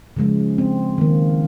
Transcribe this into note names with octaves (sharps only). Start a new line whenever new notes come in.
C#3 F3 G#3
C4
D#3 A#3